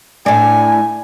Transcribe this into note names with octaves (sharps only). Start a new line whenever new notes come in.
A2 D4 G#5